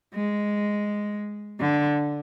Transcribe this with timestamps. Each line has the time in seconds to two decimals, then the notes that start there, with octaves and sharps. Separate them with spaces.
0.14 G#3
1.60 D3